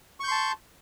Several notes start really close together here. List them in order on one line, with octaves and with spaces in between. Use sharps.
C#6 G6 C6 A5